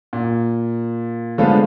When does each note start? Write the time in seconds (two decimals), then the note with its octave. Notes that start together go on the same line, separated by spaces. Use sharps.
0.13 A#2
1.38 D3 F3 G#3 A3 B3 F4